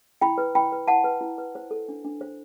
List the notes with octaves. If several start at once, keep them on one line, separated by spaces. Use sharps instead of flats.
E4 G5 B5
B4
E4 G5 B5
B4
E4 F#5 A5
B4
E4
B4
C5
A4
D4
D4
C5